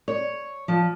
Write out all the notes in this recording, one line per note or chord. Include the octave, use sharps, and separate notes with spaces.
C#5
F3